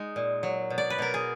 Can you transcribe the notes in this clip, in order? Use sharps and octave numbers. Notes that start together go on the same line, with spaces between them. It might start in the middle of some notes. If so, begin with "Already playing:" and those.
Already playing: G#3 D#4
A#2
F#3
B2
D5
B4
B2 A#4
G#4